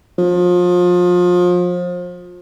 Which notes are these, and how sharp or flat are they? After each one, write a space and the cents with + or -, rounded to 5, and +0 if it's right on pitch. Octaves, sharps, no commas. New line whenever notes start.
F3 +30